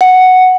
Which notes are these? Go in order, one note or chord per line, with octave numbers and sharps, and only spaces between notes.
F#5